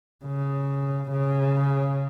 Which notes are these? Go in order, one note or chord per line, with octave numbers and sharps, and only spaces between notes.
C#3
C#3